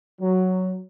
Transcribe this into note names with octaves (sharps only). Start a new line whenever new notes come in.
F#3